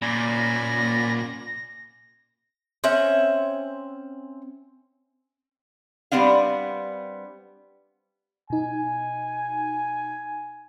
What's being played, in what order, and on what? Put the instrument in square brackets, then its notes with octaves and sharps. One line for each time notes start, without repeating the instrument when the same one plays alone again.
[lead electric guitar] A#2 [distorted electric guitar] A#3 C#4 [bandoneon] D5 G#5 B5 [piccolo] A#6
[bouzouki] C4 C#4 E5 F#5
[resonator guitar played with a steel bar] G3 B3 C4 D4 F5
[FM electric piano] B2 D#4 [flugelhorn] G#5